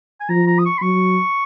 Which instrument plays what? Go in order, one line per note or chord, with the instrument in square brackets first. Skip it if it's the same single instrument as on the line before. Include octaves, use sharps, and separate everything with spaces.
[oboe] G#5
[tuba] F3 [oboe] A#5
[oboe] A#5
D#6
C#6
B5
[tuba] F#3 [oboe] C#6